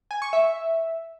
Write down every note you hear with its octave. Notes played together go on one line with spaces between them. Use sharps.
G#5
C#6
E5